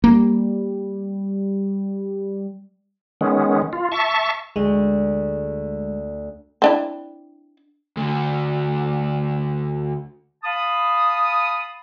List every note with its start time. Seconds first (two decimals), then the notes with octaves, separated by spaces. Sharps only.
0.04 G3 A#3
3.21 D#3 G#3 B3 C#4
3.73 F4
3.92 E5 A5 C#6
4.56 D2 G#3
6.62 C4 D4 E4
7.97 D2 D3
10.44 F5 A5 B5 D#6